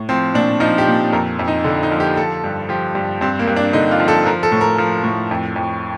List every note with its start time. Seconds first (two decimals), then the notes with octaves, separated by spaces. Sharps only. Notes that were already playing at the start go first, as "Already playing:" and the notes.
Already playing: A2
0.09 F3 C4
0.34 A#2 D4
0.60 F3 D#4
0.78 G4
0.87 A#2
1.13 F2 A#4
1.39 F2
1.48 D#4
1.64 D3
1.83 D#4
1.92 F3
2.00 G4
2.17 F3 A4
2.44 G2
2.69 F3 G4
2.95 G2
3.21 G2 C4
3.39 A#3
3.47 G2
3.56 D4
3.73 D3 D#4
3.91 F4
4.00 F3
4.08 A4
4.26 F3 A#4
4.43 A4
4.52 A2
4.61 A#4
4.78 F3
5.04 A2
5.31 F2
5.56 F2